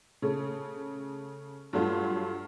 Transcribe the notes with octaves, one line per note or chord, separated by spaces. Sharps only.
C#3 A3
G2 F#3 A3 F4